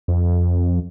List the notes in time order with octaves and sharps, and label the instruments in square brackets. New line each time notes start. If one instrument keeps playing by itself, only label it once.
[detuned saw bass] F2